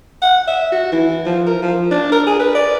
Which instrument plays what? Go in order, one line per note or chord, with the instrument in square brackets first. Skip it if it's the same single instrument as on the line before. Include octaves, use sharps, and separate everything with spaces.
[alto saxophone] F#5
E5
F#4
E3
F3
A#4
F3
D4
A#4
G#4
B4
D5